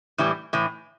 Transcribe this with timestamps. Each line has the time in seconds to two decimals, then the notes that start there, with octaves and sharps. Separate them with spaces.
0.18 A2 E3 G3
0.53 A2 E3